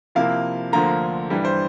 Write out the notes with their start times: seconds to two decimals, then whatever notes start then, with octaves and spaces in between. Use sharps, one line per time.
0.15 C3 F3 A#3 E4 F5
0.72 D2 D3 F3 A#3 F4 A#5
1.30 G2 E3 G3
1.45 C5